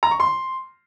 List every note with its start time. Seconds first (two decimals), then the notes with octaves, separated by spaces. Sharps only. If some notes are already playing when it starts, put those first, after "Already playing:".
0.03 A#5
0.11 C#6
0.20 C6